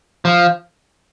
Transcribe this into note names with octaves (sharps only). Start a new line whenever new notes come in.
F3